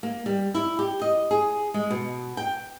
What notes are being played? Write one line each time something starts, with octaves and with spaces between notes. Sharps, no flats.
A#3
G3
E4
G4
D#5
G#4
G#3
B2
G5